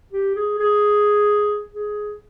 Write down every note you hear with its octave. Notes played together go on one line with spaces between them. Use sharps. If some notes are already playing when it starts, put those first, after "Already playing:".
G4
G#4
G#4
G#4